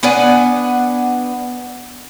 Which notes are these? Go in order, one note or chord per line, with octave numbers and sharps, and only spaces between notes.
B3 D4 F#5 G#5